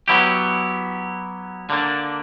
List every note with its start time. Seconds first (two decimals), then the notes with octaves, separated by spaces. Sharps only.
0.08 F#3 B3 E4 G4
1.70 D3 A#3 D4